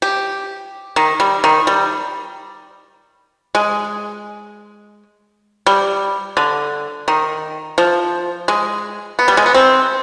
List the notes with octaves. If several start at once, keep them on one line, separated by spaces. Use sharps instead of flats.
G4
D#3
G3
D#3
G3
G#3
G3
D3
D#3
F3
G#3
B3
G3
G#3
B3
C4